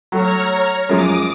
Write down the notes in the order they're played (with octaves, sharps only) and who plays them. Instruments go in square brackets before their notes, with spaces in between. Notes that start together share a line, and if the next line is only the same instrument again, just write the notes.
[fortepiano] F#3 A3 F#4 [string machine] C#5 A#5 F6
[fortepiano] F#2 F3 G#3 [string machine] D6 D#6